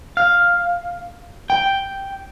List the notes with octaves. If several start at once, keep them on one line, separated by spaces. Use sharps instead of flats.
F5
G5